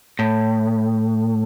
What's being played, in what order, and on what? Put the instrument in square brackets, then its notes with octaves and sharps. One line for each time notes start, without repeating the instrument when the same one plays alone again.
[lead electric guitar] A2